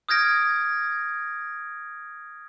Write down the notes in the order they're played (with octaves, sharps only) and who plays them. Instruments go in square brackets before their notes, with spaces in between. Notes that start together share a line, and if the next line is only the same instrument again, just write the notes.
[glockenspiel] D#6 F6 G6 G#6 A#6 D7